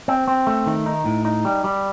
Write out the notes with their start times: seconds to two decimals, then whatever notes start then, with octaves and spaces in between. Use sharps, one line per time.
0.08 C4
0.28 C4
0.47 A3
0.66 D#3
0.86 D#4
1.05 A2
1.25 D#4
1.45 G3
1.64 G3